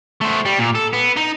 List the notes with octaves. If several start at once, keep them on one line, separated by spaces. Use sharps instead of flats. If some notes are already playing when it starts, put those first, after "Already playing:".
A3 C5
G3
A#2
A4
B3
D#4